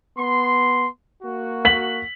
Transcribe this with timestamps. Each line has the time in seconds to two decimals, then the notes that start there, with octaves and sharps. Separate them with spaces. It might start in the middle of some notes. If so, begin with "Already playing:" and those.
0.16 B3 C6
1.22 A#3 F#4
1.65 B6 F#7